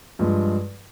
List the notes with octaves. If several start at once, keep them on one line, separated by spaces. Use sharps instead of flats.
G2 F3 G#3